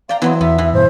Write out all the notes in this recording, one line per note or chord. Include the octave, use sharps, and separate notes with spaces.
D5 F5 G5 A#5
E3 F#3 B3 C4
E2 B3 E5
E3
G2 B2 C5